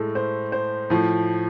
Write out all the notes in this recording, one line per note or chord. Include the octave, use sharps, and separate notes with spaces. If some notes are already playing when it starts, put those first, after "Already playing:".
Already playing: A2 G#3 A4
C5
C5
A2 F3 A3